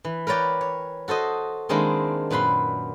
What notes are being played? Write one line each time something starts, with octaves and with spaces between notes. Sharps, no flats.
E3
A#4 B4 C#5 D5 G5
C#5
F#4 A4 C5 D#5
D#3 G#3 A#3 C4 D4 E4
F#2 A#2 B4 B5 C6